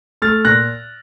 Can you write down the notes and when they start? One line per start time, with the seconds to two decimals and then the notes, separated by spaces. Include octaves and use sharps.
0.22 A3 F6 A6
0.45 A#2 F#6 A#6